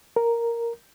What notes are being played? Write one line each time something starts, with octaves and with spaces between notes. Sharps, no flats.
A#4